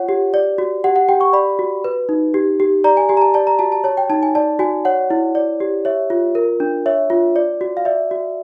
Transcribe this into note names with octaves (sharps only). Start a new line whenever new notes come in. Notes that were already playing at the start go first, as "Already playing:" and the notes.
Already playing: F4 C#5 F#5
G4
D5
F#4
G4 F#5
F#5
G4 G5
C#6
D5 B5
F#4
B4
D#4
G4
G4
D5 A#5
G#5
G4 G#5
A#5
A5
D5 A5
A#5
F#4 A5
A5
C#5 A5
G5
D#4 A5
G#5
D5 A5
F#4 G#5
C#5 F#5
E4
D5
G4
C#5 E5
F4
A#4
D4
C#5 E5
F4
D5
F#4
F5
D5 E5
F#4